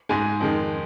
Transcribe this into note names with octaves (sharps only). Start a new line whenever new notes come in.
G#2 G#3 G#5
F2 D#3 G#3